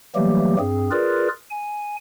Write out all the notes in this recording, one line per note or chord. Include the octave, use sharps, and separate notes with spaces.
E3 F#3 G3 A3 A#3 G4
G2 C4 G#4
F4 G#4 A#4 B4 D5
G#5